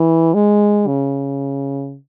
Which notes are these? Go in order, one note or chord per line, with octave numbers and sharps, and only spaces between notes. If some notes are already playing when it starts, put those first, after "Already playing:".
Already playing: E3
G#3
C#3